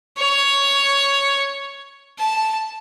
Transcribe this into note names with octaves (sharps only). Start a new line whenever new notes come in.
C#5
A5